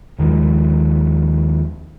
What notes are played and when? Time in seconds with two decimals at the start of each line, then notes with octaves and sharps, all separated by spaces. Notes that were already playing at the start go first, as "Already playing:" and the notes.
0.18 D#2 D#3 F3 G#3